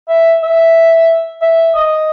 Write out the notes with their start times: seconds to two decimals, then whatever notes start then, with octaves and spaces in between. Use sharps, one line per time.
0.09 E5
0.43 E5
1.42 E5
1.75 D#5